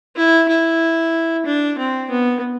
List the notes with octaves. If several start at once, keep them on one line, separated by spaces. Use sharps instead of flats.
E4
E4
D4
C4
B3